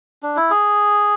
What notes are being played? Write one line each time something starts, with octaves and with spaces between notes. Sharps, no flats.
D4
E4
G#4